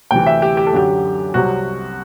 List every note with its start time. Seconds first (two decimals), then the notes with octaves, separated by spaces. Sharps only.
0.11 D2 C3 E3 G5
0.27 E5
0.42 G4
0.57 G4
0.67 A4
0.73 F#2 D3 F#3 G4
1.34 C2 C3 F#3 F#4